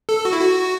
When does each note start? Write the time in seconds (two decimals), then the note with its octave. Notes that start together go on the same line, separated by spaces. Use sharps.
0.09 A4
0.25 F#4
0.32 E4
0.40 F#4